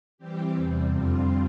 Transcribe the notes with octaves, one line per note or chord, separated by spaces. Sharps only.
E3 G3 C4 G4
E2 C3 G3 C4
F2 D3 G3 C4 F4